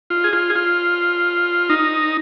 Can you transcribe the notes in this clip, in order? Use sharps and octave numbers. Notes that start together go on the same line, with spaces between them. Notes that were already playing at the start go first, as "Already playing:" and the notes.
F4
G#4
F4
G#4
F4
D#4